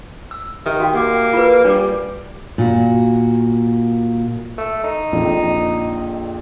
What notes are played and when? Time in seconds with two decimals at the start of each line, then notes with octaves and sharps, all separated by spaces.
0.31 E6
0.66 D#3 G4 E5
0.80 F#4 F5 G5
0.93 A#3 G4 F#5 D6
1.33 F4 G#4 B4
1.65 G3 D4 D6
2.58 A#2 F#4
4.58 A3
4.84 D#4
5.12 A#1 F2 A#2